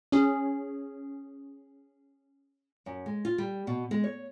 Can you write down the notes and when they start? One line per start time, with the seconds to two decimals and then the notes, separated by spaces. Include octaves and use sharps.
0.12 C#4 G#4
2.86 F#2
3.06 G#3
3.25 F4
3.38 G3
3.67 B2
3.91 G#3
4.04 C#5